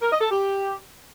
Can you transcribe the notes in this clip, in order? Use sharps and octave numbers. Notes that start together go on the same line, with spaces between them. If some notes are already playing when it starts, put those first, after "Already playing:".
A#4
D#5
A4
G4